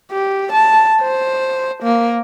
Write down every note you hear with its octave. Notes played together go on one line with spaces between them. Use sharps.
G4
A5
C5
A#3